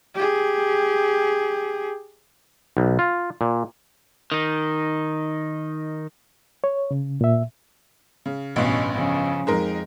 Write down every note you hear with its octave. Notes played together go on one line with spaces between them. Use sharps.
G4 G#4
B1
F4
A#2
D#3 D#4
C#5
C#3
A#2 E5
C#3
A1 G2 B2 B3 C#4
C#3 F3
F2 G#3 D#4 A#4